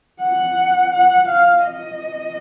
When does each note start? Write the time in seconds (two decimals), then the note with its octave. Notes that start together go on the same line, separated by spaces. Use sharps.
0.21 F#5
0.92 F#5
1.28 F5
1.64 D#5